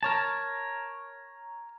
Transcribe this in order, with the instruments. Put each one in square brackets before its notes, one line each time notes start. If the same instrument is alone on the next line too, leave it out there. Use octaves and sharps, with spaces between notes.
[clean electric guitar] A#4 C#5 A5